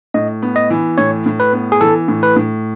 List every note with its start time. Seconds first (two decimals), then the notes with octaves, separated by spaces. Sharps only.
0.14 A2 D#5
0.42 B3
0.56 D#5
0.70 E3
0.98 A2 C#5
1.26 A2
1.40 B4
1.53 B3
1.72 G#4
1.81 E3 A4
2.08 A2
2.23 B4
2.36 A2